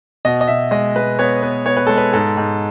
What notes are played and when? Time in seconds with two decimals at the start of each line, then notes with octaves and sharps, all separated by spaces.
0.25 B2 D#5
0.41 D#5
0.48 B2 E5
0.71 G#3 D#5
0.96 G#3 B4
1.19 B3 C#5
1.43 B3
1.66 B3 C#5
1.77 B4
1.87 G#3 A4
1.98 B4
2.13 G#2 A4
2.37 G#2